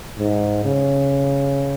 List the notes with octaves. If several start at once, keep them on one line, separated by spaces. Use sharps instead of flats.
G#2
C#3